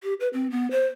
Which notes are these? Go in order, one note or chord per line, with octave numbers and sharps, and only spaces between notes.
G4
B4
C4
B3
C5